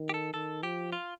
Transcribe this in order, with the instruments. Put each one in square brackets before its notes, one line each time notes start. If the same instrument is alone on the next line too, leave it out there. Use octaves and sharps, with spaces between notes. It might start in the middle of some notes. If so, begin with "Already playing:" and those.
Already playing: [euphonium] D#3
[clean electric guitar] G4
A4
[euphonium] D#3 [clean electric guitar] A4
[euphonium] F3 [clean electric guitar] G4
[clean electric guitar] F4